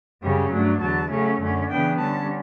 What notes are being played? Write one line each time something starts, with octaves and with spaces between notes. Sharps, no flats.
F#2 C#3 G3 C#4
G2 F#3 A3 D4
E2 D3 F#3 A5
C#3 F#3 A3 C#4
F#2 D3 A3 C#4
C#3 E3 B3 D4 G5
D3 G3 C#4 A5